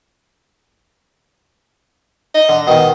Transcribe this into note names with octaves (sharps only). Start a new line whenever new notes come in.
D#5
D3
B2 D#3 D#5